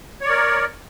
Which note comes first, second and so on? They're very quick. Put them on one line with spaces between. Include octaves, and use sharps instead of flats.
C#5 D5 A#4